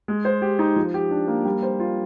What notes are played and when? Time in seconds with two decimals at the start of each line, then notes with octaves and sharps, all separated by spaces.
0.08 G#3
0.25 C5
0.42 G4
0.59 D#4
0.76 F3
0.94 G4
1.11 D4
1.28 A#3
1.45 G3
1.63 C5
1.80 F4